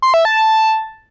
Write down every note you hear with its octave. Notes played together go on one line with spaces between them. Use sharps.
C6
E5
A5